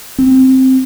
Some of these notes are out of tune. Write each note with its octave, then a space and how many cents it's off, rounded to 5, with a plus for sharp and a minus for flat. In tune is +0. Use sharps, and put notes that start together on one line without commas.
C4 +0